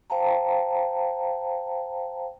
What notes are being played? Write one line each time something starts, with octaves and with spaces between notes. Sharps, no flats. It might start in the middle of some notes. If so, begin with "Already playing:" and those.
C5 F5 G5 A5 A#5